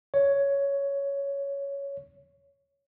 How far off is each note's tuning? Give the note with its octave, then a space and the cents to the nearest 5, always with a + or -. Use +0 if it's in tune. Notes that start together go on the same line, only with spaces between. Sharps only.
C#5 +10